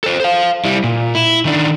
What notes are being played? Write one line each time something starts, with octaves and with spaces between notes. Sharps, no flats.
A4 C5
C5 F5
G3 E4
A#2
E4
D#3 D4